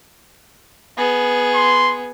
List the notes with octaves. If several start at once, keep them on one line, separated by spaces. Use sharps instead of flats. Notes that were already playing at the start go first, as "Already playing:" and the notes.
B3 G#4
C6